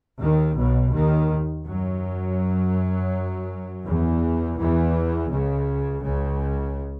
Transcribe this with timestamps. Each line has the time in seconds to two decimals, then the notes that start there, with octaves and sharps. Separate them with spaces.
0.19 D#2 D#3
0.56 B1 B2
0.93 D#2 D#3
1.65 F#2 F#3
3.84 E2 E3
4.57 E2 E3
5.29 C#2 C#3
6.02 C#2 C#3